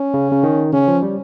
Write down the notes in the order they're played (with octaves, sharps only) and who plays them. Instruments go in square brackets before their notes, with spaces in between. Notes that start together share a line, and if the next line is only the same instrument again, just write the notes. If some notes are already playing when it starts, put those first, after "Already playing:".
Already playing: [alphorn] C#4
[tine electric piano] C#3
C#3
D#3
[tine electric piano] C#3 [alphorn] C#4
[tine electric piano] F3
G3